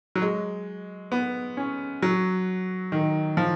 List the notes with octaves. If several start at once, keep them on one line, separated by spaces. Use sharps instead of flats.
F#3
G#3
B3
C#4
F#3
D#3
F3